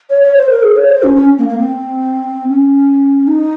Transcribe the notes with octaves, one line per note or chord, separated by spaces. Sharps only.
C#5
C#5
C5
A#4
G#4
C#5
C5
C#4
C#4
A#3
A#3
C4
C#4
D#4